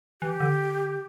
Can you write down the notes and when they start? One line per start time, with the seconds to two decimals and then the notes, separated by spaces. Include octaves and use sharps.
0.22 E3 G4
0.40 D3